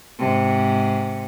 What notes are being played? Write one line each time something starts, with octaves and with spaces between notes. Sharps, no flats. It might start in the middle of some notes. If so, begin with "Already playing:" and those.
G#2 C3